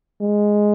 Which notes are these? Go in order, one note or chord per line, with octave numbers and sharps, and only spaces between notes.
G#3